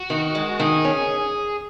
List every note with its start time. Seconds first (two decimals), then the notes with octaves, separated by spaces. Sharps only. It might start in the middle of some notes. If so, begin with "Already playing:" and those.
Already playing: F#4
0.10 D#3
0.35 G#3
0.60 D#3 G#4
0.85 C#4